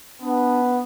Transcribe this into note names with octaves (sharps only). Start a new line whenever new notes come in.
B3 D4